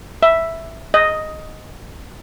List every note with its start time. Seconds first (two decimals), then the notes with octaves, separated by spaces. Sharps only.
0.23 E5
0.94 D#5